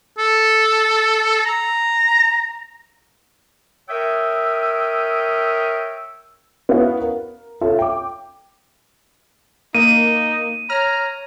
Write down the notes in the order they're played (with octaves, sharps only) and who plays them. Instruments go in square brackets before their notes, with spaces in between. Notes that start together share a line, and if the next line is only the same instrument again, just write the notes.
[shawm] A4
A#5
[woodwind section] A#4 C#5 E5 G5 D#6 E6
[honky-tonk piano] B3 C#4 E4 F#4 F5 F#5
A#4
F4 A4 C#5 E5
G5 D6
[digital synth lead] A#3 [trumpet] D#4 [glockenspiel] D#7
[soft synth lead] C#5 [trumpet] A#5 [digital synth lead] F6